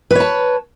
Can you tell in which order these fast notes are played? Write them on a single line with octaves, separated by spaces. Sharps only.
B4 C#5 A5